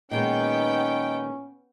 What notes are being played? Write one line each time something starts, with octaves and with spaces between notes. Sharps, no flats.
A#2 D#3 G#3 B3 C#4 D#4 G5